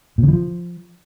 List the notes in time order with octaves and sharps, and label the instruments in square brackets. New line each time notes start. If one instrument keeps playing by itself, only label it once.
[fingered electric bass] A#2
C#3
E3
F3